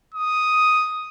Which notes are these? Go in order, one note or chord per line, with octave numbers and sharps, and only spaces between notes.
D#6